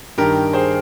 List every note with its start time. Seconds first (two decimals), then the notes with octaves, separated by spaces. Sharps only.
0.18 G2 D#3 G4 A#4
0.53 G#4 C5